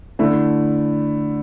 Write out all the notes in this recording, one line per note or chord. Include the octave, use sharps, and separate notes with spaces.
D3 A3 E4